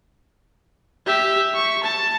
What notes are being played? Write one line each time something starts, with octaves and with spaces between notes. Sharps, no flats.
G4 E5
C#6
A5